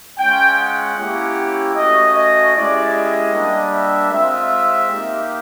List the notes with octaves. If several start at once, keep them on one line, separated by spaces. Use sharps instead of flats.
G#3 C#4 F4 G5
F#5
A#3 C#4 E4 G4
A3 C#4 F#4 D#5
D#5
G#3 C#4 E4 G4 D5
D#5
G3 A#3 D4
E5
G#3 C4 F4 E5
A#3 D#4 G4